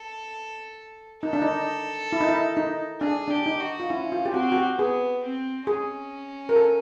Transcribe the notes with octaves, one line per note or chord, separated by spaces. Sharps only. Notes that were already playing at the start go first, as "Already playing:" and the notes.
Already playing: A4
D#4 A4
D4
D#4
E4
D#4
E4
D#4
D4 G#4
D4 G4
D#4
F#4
F4
C#4 E4
F4
G4
C4 F#4
F#4
G4
B3 G#4
C4
C#4 G#4
A#4
A4